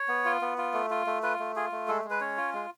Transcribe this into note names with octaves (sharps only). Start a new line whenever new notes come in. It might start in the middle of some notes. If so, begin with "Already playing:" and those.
Already playing: C#5
B3
F4
B3
F4
A3
F4
A3
F4 B4
A3
F4 G#4
A3
G#3 A4
G#3
B4
C#4 C#5
F4
G#3